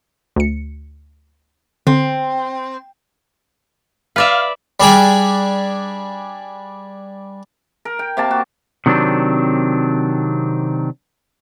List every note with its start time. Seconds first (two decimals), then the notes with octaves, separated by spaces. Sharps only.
0.36 D2 C#7
1.87 D3 C4
4.16 B4 D5 E5 F5 F6
4.80 G3 D4 G#4 G5
7.85 A#4
7.99 G5
8.17 C3 A#3 A5
8.31 F#4
8.86 C3 D#3 F#3 C4 D4